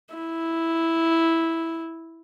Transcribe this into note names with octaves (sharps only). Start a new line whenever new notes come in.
E4